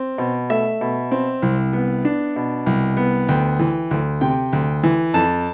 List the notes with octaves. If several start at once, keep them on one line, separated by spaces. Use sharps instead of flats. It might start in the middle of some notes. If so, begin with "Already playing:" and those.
Already playing: C4
B2
A3 E5
B2
C4
C2
B3
D4
B2
C2
B3
D2 G5
E3
D2
C3 G5
D2
E3
F2 A5